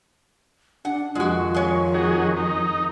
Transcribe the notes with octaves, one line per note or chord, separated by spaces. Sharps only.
D4 F#5
F2 D#3 G#3 F4 F#4
G#3 C#5
D#4 F#4 G#4
D#4